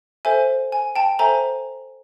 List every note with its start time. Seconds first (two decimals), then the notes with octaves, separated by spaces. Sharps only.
0.25 A4 C5 E5 G#5
0.72 G#5
0.95 G5 A5
1.19 A4 C5 E5 G#5 A#5